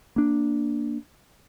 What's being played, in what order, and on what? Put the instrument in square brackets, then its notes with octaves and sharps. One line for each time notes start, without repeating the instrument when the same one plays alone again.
[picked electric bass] A#3 D4